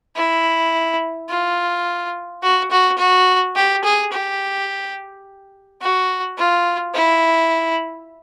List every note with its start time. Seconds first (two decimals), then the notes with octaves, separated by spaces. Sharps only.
0.16 E4
1.29 F4
2.42 F#4
2.71 F#4
2.98 F#4
3.56 G4
3.84 G#4
4.12 G4
5.82 F#4
6.38 F4
6.94 E4